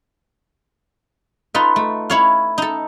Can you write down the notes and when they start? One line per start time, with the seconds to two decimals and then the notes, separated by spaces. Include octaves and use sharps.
1.54 D#4 F4 A4 B4
1.76 A3
2.10 E4 C#5 F5
2.58 D#4 A4